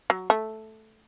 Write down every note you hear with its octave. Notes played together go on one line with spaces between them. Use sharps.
F#3
A3